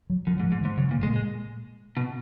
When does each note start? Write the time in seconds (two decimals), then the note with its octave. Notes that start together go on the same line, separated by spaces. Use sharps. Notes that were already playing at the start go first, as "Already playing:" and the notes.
0.10 F#3
0.27 F#2 F3
0.36 F#3
0.40 G#2
0.44 F3
0.52 G#2
0.61 D#3
0.65 G#2
0.77 F#2 C#3
0.91 A#2
0.99 B2
1.03 A#2 G#3
1.16 G#3
1.97 B2